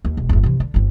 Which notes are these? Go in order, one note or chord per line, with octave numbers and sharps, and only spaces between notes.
D#2
E1
G1 E2
C3 E3
D3
G1 C4